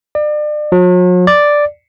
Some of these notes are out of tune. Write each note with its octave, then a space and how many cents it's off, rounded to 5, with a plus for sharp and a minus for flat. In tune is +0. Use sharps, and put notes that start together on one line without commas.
D5 +35
F#3 -45
D5 +0